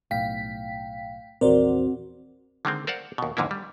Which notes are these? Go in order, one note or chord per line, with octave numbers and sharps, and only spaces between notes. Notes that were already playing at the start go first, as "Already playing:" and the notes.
B1 A2 F5 G5 B6
A#1 E2 C4 F#4 A#4 C5 D5
D3 D#3 G#3 C4
A#4 C5 D5 F5 F#5
D#2 B2
F2 G#2 D3 A#3 E4
G3